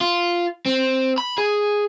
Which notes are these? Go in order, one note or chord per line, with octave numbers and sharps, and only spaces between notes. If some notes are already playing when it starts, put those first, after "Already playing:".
F4
C4
B5
G#4